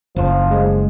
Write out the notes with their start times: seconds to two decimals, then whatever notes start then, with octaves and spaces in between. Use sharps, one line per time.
0.16 F#1 F3
0.51 G#3